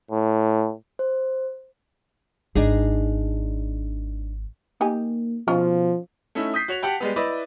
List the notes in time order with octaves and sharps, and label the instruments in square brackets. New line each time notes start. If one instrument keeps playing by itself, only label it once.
[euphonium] A2
[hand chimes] C5
[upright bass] G#1 [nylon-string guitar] D4 D#4 G#4
[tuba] A#3 [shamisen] D#4 G4 G#5
[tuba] B2 [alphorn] F3 [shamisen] C#4 D#4 F4
[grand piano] A3 C#4 D#4 E4
D#6 G6 B6 C7
F#4 C#5 F7
G4 F#5 G5 A5
G3 G#3 B3
E4 B4 D5 D#5